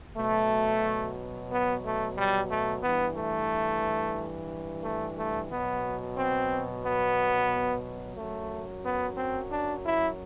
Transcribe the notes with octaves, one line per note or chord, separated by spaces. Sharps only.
B2 F#3 A3
B3
A3
G3
A3
G2 E3 B3
A3
A3
A3
B2 F#3 B3
C4
B3
F#2 F#3 A3
B3
C4
D4
E4